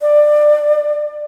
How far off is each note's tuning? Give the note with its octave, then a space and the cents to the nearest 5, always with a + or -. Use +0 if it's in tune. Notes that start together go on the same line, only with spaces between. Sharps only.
D5 +20